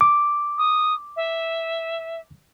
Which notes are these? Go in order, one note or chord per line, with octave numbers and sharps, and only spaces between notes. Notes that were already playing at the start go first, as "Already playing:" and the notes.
D6
D#6
E5